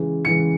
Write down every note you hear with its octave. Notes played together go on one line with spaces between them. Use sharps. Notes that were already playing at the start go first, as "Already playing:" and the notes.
Already playing: C#3 E3 G#3
C#3 E3 G#3 C#7